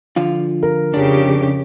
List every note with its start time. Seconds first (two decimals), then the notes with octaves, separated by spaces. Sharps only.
0.16 D3 F3 F4
0.63 A#4
0.94 F2 C#3 D4 G4